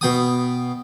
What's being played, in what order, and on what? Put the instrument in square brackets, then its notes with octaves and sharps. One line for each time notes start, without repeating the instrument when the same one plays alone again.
[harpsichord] B2 G5 D#6